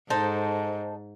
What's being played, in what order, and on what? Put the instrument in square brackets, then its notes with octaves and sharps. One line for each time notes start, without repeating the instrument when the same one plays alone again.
[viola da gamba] G#2 [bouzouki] D#4 A4 C5